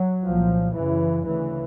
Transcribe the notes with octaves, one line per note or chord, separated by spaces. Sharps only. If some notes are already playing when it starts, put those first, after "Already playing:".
Already playing: F#3
C2 A#2 F3
F#2 C#3 E3
D2 C#3 E3